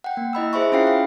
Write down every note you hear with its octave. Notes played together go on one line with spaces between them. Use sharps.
F#5 G5
A#3
E4 D#5 B5 E6
G#4 C5 E5 B5 C#6
C#4 E4 F4 F5 G5 C7
G5